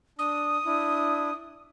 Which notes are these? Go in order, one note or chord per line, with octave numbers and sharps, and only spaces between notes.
D4 D#6
D4 E4